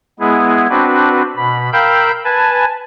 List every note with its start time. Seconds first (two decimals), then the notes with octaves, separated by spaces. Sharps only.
0.20 G#3 B3 E4 G#4
0.70 C4 D4 F#4 B4
1.37 B2 B5
1.73 A#4 F5 G5 B5 E6 G6
2.25 B4 G#5 A5